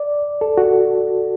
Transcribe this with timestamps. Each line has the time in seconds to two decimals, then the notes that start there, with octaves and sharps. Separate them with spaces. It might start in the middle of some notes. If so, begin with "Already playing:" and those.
Already playing: D5
0.41 A4
0.58 F#4